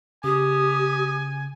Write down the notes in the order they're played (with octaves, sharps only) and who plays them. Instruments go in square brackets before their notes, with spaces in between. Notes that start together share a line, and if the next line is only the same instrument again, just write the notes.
[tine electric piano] C#3 [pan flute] G4 [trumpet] G#5 [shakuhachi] D#6